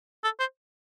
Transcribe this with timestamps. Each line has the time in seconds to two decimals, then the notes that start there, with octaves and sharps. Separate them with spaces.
0.24 A4
0.40 C5